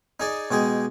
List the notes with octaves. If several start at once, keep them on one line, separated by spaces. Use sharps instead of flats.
D#4 G#4 D5
B2 G#3 G4 G#4